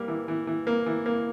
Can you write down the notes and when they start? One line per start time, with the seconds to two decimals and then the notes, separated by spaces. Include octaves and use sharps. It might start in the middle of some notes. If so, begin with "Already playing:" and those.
Already playing: G3 A#3
0.08 E3
0.28 E3
0.47 E3
0.67 A#3
0.86 E3
1.06 A#3